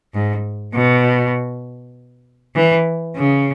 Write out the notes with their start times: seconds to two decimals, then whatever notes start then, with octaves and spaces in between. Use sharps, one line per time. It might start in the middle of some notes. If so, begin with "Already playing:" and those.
0.14 G#2
0.74 B2
2.55 E3
3.16 C#3